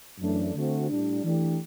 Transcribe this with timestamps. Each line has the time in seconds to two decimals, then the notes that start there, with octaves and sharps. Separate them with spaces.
0.19 F#2 E3 A3 D4
0.54 D3 A3 C4 F#4
0.89 A2 G3 D4
1.22 E3 A3 D4 G4